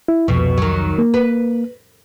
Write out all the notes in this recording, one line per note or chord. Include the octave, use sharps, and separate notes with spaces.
E4
C2 F2 B2
D#3 F#3
A#3
B4